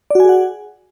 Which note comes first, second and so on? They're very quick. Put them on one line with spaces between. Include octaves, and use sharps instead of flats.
D5 F#4 G#5 G#4 F#5